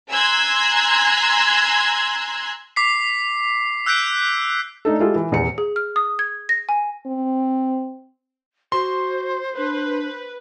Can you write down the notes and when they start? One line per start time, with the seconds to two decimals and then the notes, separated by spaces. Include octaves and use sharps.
0.10 G#5 A#5 C6 E6 F#6 G#6
2.76 D6 B6 C7
3.86 E6 F#6 G6 B6 D7
4.85 A3 D4 D#4 A4
5.00 G#3 E4 F4 G4 A4
5.15 E3
5.31 D#1 E2 C#7
5.58 G#4
5.76 F6
5.96 D#6
6.19 G#6
6.49 A#6
6.69 G#5
7.06 C4
8.72 F#4 C5 C6
9.57 D4 B4